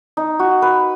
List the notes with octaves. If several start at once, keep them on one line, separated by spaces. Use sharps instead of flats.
D#4
F#4
B4